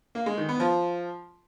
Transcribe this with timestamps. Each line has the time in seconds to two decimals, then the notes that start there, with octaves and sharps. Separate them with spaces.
0.15 A#3
0.26 G#3
0.37 D#3
0.49 B3
0.60 F3